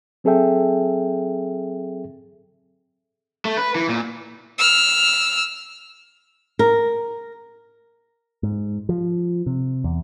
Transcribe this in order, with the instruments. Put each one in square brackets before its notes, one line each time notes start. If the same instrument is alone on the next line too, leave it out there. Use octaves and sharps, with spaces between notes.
[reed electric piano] F#3 C4 G#4 A4 E5 G5
[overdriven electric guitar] A3
B4
E3
A#2
[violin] E6 F6
[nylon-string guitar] A#4
[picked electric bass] G#2
F3
C3
E2